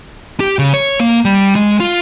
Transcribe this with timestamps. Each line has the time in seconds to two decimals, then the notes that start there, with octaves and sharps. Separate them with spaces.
0.40 G4
0.59 C#3
0.74 C#5
1.00 A#3
1.25 G3
1.56 G#3
1.80 F4